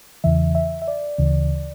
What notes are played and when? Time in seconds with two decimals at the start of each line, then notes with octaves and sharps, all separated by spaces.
0.24 E2 C#3 E3 E5
0.55 E5
0.82 E5
0.88 D5
1.18 D2 C#3 E3